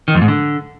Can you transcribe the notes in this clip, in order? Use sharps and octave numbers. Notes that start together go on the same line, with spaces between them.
D#3
F2
G#2
D3